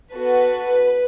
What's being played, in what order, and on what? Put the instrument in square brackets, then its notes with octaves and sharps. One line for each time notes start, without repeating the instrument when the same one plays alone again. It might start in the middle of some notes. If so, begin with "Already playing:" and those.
[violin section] B3 F#4 A4 B4